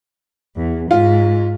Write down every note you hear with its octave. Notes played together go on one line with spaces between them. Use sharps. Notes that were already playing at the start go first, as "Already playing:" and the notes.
E2
G#2 F4